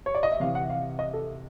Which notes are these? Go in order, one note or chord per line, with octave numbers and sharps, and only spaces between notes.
C#5
D5
D#5
E5
C3 E3 F5
F#5
F5
D#5
A4